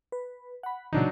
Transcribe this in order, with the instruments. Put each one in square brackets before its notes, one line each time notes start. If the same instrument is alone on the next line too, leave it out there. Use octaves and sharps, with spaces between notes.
[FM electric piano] B4
F#5 B5
[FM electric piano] A#2 C#3 E3 [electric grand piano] F#3 D4 D#4